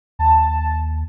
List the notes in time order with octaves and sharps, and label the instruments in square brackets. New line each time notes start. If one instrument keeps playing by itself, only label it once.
[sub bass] D#2 [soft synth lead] A5